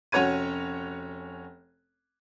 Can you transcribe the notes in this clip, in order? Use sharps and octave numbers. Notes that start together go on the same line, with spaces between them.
F1 C#4 F#4 C#5 G#6 D#7